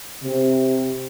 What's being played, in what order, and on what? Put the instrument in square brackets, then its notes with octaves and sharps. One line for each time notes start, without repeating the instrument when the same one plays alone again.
[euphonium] C3